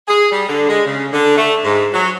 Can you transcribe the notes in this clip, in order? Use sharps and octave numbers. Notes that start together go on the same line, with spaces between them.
G#4
G3
D3
G#3
C#3
D3
A3
G#2
F#3